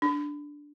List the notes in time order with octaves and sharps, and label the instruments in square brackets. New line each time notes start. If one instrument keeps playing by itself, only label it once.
[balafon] D4